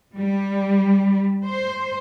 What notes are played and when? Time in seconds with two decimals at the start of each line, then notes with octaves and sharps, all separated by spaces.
0.16 G3
1.45 C5